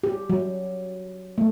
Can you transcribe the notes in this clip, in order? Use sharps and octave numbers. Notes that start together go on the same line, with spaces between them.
G4
F#3
A3